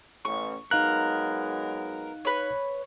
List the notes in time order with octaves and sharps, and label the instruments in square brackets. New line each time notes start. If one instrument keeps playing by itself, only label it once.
[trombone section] A1 [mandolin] C#6
[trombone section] F#3 G#3 B3 [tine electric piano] D#4 F5 F#6 [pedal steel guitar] A#4
[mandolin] B4 C#5